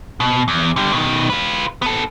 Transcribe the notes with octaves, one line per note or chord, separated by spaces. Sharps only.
B2
E2
D3 G3
B2 D#3
F4 B4
B3 A4